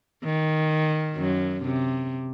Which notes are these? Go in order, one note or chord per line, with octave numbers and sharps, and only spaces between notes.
D#3
F#2 F#3
C3